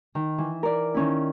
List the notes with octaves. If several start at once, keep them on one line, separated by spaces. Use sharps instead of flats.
D#3
E3
A#4 D5
D#3 C#4 E4